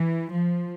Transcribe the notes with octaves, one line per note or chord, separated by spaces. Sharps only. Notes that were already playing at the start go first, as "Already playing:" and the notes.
Already playing: E3
F3